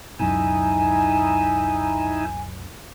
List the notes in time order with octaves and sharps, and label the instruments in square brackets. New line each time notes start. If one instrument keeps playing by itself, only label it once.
[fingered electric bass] C#2 F#2 B2 [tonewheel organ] D#4 E4 [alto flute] G#5